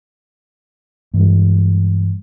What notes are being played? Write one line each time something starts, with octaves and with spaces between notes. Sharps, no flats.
G2 E3 G#3